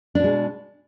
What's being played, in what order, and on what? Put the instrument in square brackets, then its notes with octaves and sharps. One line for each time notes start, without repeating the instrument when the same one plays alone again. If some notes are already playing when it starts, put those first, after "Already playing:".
[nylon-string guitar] D4
B2
G#3